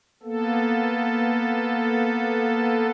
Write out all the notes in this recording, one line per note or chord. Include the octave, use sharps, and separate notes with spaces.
A#3 B3 A4